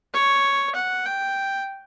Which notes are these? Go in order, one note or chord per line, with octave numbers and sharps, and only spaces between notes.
C#5
F#5
G5